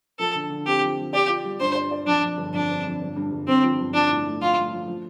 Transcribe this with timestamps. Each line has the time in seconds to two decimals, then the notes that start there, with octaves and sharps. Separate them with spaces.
0.19 F3 A4
0.35 D3
0.50 D3
0.66 C4 G4
0.82 F3
0.98 F3
1.13 G4 D5
1.29 F4
1.44 G3
1.60 G2 C5
1.75 D5
1.91 D5
2.07 F2 D4
2.22 F2
2.37 G1
2.54 F2 D4
2.70 C4
2.85 F2
3.00 G1
3.16 G2
3.32 G1
3.47 G1 C4
3.63 F3
3.79 G1
3.94 F3 D4
4.10 A2
4.26 A3
4.41 F3 F4
4.57 A3
4.71 F3
4.88 F3